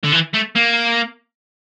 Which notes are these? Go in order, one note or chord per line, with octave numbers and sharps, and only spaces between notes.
D3
E3
A3
A#3